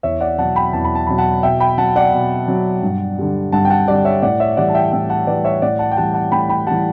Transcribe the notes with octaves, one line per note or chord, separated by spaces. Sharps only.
E2 C#5 E5
D5 F#5
B2 F#3 F#5 A5
G5 B5
E2 A5
B5
A5
B2 F#3 B5
F#5 A5
B2 E5 G5
G5 B5
F#3 F#5 A5
D5 F#5
B2
F#3
G2
D3 G3
G2 F#5 A5
G5
F#5 A5
D3 G3 D5 F#5
C#5 E5
A2 D5 F#5
C#5 E5
E3 G3 D5 F#5
A5
E5 G5
A2 E5 G5
F#5 A5
E3 G3 B4 D5
C#5 E5
A2 D5 F#5
F#5 A5
G5
E3 G3 F#5 A5
F#5 A5
A2 G5 B5
G5 B5
E3 G3 F#5 A5